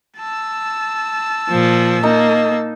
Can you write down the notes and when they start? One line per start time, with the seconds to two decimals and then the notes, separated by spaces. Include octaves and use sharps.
0.18 A5 E6
1.48 A#2 F3
2.03 A#3 D#4